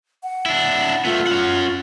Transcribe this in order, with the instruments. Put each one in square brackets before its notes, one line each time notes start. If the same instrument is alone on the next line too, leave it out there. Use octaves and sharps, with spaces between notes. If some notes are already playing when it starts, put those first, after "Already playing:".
[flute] F#5
[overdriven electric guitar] D4 E4
[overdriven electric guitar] A3 B3 [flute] F4
[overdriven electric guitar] C#4 F#5